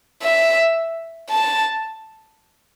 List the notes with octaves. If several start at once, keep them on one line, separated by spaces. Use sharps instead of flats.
E5
A5